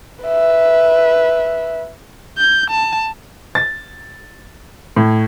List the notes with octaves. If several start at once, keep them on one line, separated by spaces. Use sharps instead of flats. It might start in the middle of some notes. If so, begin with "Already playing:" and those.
B4 E5
G6
A5
A6
A2